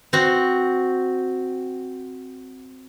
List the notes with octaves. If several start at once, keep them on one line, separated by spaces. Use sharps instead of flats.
C4 F#4